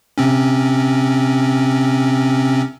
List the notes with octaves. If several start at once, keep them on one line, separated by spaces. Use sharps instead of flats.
C3 C4 C#4